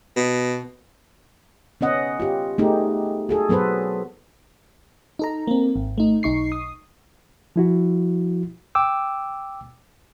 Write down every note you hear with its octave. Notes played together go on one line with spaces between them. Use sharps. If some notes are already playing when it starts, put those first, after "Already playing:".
B2
B3 C#4 D#5 F#5
F4 G4
A3 B3 D#4 G4 G#4
F#4 G#4 A4
F#3 B3 A4 B4 C5
D#4 A4 A#5
A#3 C4
G#1
A3 D#4
B1 D#4 C#6 C7
D#6
F3 E4 F#4
G5 D6 E6